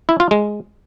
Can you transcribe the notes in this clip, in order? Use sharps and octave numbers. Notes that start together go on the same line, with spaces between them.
E4
F4
G#3